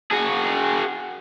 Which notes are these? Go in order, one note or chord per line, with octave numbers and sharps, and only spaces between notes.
F#4 G#4